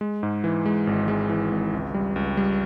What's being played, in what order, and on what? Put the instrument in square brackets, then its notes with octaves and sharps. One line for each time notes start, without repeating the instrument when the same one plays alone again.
[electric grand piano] G#3
G#2
E3
G#3
G#1
G#3
E3
G#1
C#2
G3
C#2
G3